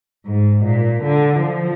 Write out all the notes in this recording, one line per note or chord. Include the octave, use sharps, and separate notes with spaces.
G#2
A#2
D3
F3